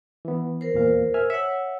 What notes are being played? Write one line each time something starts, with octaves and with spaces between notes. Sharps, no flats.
E3 B3
A#4 C5
E2 A#2 F5
E5 G#5 F6
C#5 E5 F#5